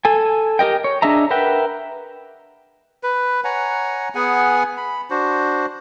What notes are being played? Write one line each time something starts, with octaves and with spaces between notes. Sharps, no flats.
A4 G#5
G4 A#4 D#5 G5
C#5
D4 G#4 D#5 E5 A#5
A#4 B4 E5 F#5 G5
B4
C#5 F#5 G#5 A#5
B3 G#4 F#5 G#5
B5
D4 F#4 C5